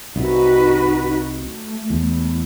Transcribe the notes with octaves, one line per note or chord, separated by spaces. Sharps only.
C2 D#4 F#4 B4
A3
E2